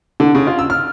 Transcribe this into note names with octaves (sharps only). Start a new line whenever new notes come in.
D3
C#3
F4
E6
F6